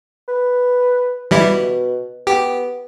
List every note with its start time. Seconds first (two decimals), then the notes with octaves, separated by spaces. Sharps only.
0.28 B4
1.31 B2 E3 G3 E4
2.27 B3 G4